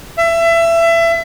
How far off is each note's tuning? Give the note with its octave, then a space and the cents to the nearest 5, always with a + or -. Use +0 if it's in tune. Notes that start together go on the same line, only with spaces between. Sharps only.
E5 +25